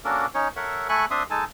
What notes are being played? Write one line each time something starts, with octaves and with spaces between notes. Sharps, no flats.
A#3 C#4 D4 F#4 A4 A#4
C#4 D#4 C#5
A4 A#4 C#5 E5 F#5
A3 A4 G#5 B5 C#6 F#6
C4 D4 E5 C6 D#6
G#3 D#4 A4 G#5 A5